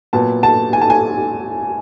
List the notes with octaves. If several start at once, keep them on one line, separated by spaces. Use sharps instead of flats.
A#2 F#3 B3 A5
A5
G#5
A5
G#5